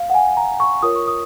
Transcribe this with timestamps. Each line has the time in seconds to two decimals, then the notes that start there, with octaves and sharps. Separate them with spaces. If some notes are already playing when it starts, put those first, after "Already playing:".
Already playing: F5
0.10 F#5
0.14 G#5
0.37 A#5
0.60 C#6
0.83 F4 A#4 C#5 D#6
0.96 C#6
1.08 D#6